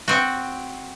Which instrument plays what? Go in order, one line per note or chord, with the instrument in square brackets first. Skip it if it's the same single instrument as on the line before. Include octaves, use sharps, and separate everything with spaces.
[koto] C4 F#4